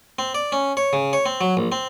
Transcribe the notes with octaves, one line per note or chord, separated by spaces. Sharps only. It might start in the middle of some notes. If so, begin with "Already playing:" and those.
C4
D5
C#4
C#5
C#3
C#5
C4
F#3
A#1
C4